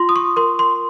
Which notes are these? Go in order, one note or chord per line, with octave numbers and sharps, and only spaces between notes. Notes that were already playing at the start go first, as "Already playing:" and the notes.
Already playing: F4 C6
D#6
C#6
A#4 C6
C6